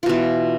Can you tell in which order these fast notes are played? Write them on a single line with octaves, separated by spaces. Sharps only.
F4 B2 E3